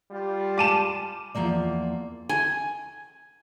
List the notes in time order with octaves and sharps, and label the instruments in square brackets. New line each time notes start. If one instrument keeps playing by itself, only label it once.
[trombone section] G3 F4
[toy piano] F5 G#5 A5 [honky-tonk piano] D6 D#7 E7
[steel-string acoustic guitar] E2 D#3 F3 A#3 D5
[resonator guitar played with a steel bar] G#5